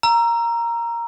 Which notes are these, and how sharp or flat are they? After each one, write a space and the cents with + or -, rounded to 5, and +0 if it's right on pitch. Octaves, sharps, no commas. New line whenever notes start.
A#5 +0 E6 +30